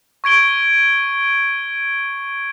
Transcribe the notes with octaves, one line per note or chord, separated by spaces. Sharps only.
C#6 G#6 D7 G7